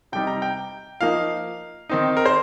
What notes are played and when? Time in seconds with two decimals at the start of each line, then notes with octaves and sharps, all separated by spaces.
0.12 C3 G3 D#4 G5
0.27 A#5
0.42 G5
1.01 F3 A#3 D#4 F5
1.89 D#3 C4 D#4
2.17 A#4
2.26 C5